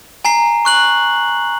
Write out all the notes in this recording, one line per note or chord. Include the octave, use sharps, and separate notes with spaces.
G#5 A#5 C7
C#6 F#6 F#7